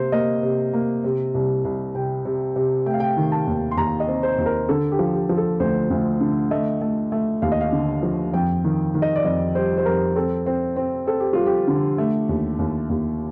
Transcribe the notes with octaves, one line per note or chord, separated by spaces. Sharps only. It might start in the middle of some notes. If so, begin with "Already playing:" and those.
Already playing: C3 A#3 C5
A#3 D#5
C3
A#3
C3
C2
C2
C3 G5
C3
C3
A3 G5
F5
G5
D#3
A5
D#2
C6
D#2 A#5
D#5
C4
C5
D#2
A#4
D3 A4
G4
F3
G4
F3
A4
D2 C5
D2
D3
A3 D#5
A3
A3
D#2 F5
D#5
F5
D3
F3
F2 G5
D#3
D#3
D#5
D5
F2 D#5
G3 C5
C5
F2 A#4
C4 A4
C4
C4
C4 A4
G4
G3 F4
G4
D3
A3
D#2
D#2
D#2